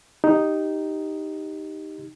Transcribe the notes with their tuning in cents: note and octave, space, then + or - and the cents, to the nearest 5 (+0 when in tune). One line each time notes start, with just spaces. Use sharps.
D#4 +0 G4 +0